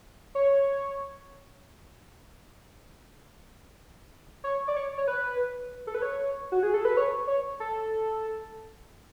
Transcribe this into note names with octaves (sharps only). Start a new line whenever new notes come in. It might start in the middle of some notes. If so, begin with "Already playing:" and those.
C#5
C#5
D5
C#5
C#5
B4
A4
B4
C#5
F#4
G#4
A4
B4
C#5
C#5
A4